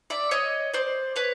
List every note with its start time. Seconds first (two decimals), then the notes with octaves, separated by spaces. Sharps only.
0.10 D5 E5
0.31 C#5 D#5
0.74 C5 D5
1.16 B4 C#5